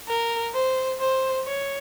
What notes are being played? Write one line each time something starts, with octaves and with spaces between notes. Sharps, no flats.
A#4
C5
C5
C#5